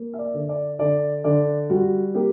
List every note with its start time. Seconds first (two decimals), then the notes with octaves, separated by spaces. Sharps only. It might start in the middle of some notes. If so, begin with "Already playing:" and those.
Already playing: A#3
0.13 E5
0.19 D5
0.34 D3
0.49 D5
0.79 D3 D5
1.24 D3 D5
1.70 G3 F#4
2.15 A#3 G4